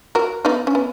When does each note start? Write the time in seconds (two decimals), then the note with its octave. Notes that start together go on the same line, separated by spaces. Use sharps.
0.15 F#4 A#4
0.45 B3 D#4
0.67 C#4
0.75 B3